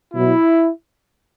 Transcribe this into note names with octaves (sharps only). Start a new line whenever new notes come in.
B2 F#3 E4